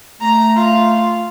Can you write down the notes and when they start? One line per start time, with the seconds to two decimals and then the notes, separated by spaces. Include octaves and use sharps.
0.21 A3 A#5
0.57 F4